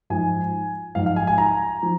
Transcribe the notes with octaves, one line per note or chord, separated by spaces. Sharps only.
G#2 F3 G#5
G#2 F3 F5
F5
G#5
G#5
A#5
F3